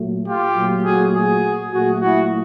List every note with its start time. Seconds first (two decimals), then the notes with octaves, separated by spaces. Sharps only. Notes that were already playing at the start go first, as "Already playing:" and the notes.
Already playing: A#2 F#3 A3
0.27 F4 G4
0.57 A#2 F#3 A3
0.85 F#4 G#4
1.14 F#4 G#4
1.72 A#2 F#3 A3 F#4 G#4
2.01 E4 F#4